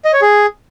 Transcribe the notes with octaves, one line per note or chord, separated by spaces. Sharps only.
D#5
C#5
G#4